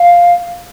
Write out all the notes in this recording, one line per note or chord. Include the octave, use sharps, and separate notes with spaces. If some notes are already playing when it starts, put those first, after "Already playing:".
Already playing: F5